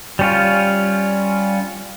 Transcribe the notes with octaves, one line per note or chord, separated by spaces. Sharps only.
G3 C#4 F4